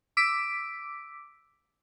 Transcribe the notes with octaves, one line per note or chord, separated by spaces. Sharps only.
D6 E6 B6 D7